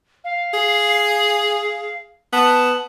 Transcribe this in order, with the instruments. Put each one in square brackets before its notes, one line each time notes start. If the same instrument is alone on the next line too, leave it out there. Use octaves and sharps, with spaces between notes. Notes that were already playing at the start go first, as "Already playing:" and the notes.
[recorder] F5
[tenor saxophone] G#4
[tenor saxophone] B3 [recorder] A5